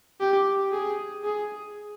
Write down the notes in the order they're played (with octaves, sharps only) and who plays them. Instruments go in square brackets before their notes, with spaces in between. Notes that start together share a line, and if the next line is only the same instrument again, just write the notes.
[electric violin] G4
G#4
G#4